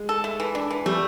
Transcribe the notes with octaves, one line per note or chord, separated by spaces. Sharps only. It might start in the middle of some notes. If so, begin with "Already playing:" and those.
Already playing: G#3
A4
A3
E3
D4
E3
G3 A3